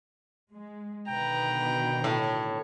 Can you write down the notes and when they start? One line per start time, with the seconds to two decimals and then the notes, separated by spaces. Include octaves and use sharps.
0.54 G#3
1.08 B2 D3 D#3 B4 G5 A#5
2.04 A2 C#5